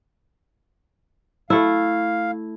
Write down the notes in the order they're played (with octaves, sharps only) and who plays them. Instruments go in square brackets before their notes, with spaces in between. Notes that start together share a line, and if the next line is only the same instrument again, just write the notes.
[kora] A3 E4 [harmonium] F5